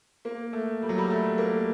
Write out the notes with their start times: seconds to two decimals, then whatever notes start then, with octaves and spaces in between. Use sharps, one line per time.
0.25 A#3
0.53 A3
0.82 G3
0.89 F#3
0.98 G3
1.10 A3
1.38 A#3